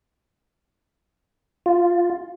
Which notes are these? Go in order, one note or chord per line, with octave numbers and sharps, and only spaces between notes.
F4